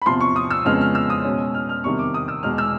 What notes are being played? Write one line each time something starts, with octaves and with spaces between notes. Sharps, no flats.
B5
E2 C3 F3 C6
C#6
D#6
E6
F2 C#3 F3 G#3 B3 F6
F6
E6
D#6
B2 G#3 C#4
F6
F6
E2 C3 D#3 G3 C#6
D6
D#6
E6
E2 B2 G#3 F6
E6